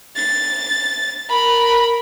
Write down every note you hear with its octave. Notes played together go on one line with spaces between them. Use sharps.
A6
A#4 B5